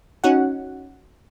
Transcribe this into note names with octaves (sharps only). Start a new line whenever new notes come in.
C#4 D#4 F#4 F#5